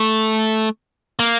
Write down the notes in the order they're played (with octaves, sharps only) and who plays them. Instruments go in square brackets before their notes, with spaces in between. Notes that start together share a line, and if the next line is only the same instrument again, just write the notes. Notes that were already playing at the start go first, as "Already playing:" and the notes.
Already playing: [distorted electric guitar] A3
A#3